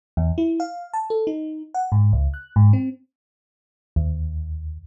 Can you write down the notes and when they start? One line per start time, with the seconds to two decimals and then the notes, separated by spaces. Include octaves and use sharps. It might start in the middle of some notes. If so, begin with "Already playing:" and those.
0.17 E2
0.38 E4
0.60 F5
0.93 A5
1.10 A4
1.27 D#4
1.74 F#5
1.92 G#2
2.13 C#2
2.34 F#6
2.56 G#2
2.73 C4
3.96 D#2